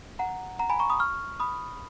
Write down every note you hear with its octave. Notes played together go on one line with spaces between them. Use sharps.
F#5 A#5
F#5 A#5
G#5 B5
A#5 C#6
B5 D#6
C#6 F6
B5 D#6